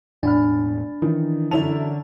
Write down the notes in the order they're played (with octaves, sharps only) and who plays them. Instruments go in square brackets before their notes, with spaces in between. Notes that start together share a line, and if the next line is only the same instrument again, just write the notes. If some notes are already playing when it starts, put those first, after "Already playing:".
[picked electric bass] E1 A2 [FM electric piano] D4 [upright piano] G#5 B5 F6
[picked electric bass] D#3 [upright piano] E3 C#4
[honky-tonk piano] F#2 E4 F7 [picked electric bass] D3 [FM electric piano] A4 C#5 A5